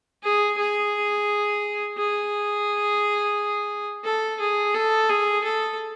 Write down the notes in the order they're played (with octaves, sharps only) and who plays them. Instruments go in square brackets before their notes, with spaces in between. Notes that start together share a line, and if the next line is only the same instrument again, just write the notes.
[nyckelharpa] G#4
G#4
G#4
A4
G#4
A4
G#4
A4